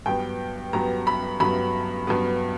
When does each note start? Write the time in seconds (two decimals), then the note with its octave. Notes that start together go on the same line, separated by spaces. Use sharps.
0.06 G2 F#3 B3 G5
0.73 G2 F#3 B3 A#5
1.07 B5
1.40 G2 F#3 B3 B5
2.07 G2 F#3 B3